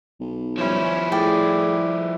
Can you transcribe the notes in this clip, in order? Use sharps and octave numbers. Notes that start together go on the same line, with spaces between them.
B1
F3 G3 C#4 E4
A2 G#4 D5 G5